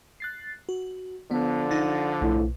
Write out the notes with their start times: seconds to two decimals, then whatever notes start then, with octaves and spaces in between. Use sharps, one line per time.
0.20 F#6 A6 C7
0.69 F#4
1.31 D3 F3 B3
1.71 D#4 A6 A#6
2.21 B1 A2